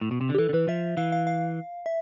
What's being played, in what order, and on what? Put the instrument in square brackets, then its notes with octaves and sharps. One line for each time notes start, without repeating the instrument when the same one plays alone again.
[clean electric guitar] A2
B2
C3
D3
[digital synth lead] G4
[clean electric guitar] E3 [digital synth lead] A4
[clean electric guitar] D3
[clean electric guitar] E3 [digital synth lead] B4
[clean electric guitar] F3 [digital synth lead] E5
[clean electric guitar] E3 [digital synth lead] F5
[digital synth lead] F5
F5
E5